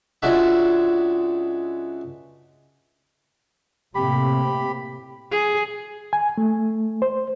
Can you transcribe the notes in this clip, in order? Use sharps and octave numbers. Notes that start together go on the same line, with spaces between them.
C#2 G#3 D4 F#4 E5
A2 C3 A#3 G4 B5
G#4
G#5
A3
C5